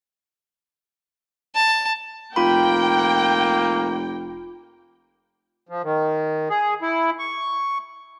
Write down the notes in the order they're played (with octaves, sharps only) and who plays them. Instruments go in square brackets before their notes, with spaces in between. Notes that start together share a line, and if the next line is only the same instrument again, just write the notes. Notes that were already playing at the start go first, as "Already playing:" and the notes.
[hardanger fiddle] A5
[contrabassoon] F1 [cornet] A#3 [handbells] F4 B5 [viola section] G5
[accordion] F3
D#3
G#4
E4
C#6